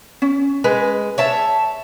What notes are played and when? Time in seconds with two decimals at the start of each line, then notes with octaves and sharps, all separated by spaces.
0.22 C#4
0.64 G#3 B4
1.18 C#5 E5 A5